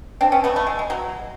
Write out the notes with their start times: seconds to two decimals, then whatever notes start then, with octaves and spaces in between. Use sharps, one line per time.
0.21 C4 D4
0.32 B3 C#4
0.44 A3 B3
0.56 A3
0.67 G#3
0.79 G#3
0.90 F#3